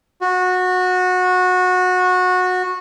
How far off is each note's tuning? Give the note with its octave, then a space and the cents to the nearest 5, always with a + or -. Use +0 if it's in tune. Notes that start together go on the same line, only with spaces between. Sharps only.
F#4 -20